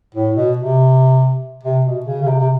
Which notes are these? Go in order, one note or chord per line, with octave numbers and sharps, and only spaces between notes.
A2
B2
C3
C3
B2
C#3
C#3
C3
C3